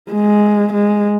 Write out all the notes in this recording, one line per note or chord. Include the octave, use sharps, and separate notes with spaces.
G#3
G#3